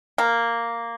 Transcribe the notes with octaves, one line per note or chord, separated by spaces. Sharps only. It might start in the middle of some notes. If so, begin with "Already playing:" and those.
A#3